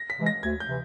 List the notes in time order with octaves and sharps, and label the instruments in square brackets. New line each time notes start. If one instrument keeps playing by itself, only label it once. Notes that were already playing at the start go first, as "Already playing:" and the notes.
Already playing: [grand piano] A#6
B6
[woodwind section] C3 E3 G#3
[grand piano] A#6
[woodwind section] D2 [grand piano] G#6
[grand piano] G6
[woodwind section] C3 E3